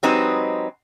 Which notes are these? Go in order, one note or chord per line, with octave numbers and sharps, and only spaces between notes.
F#3 G#3 C4 D#4 G4 B4